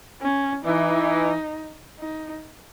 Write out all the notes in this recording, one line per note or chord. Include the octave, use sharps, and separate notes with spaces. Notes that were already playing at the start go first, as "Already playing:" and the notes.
C#4
E3 D#4
D#4